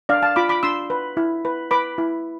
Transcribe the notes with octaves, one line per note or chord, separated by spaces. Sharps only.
D4 D5 F5
F5 A5
F4 B5 D6
B5 D6
D4 C6 E6
B4
E4
B4
B4 B5 D6
E4